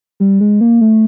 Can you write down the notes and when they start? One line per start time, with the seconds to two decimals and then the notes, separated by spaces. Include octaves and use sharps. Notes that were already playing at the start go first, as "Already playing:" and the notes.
0.20 G3
0.41 G#3
0.61 A#3
0.81 A3